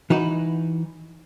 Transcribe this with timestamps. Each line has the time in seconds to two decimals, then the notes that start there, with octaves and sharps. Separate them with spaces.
0.10 E3 D#4 F#4 B4